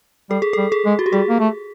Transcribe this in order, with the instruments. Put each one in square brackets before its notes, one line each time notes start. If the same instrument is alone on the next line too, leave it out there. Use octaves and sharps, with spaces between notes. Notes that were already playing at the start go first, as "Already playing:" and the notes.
[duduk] G3 [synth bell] A4
[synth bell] G#4
[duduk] G3 [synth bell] A4
[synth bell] G#4
[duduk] G#3
[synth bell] F#4
G4
[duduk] G3 [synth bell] G#4
[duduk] A#3
A3